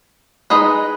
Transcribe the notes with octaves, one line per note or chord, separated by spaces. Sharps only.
G#3 D#4 G#4 B4 D#5